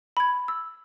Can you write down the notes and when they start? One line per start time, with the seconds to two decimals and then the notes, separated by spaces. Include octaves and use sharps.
0.17 B5 G#6
0.48 E6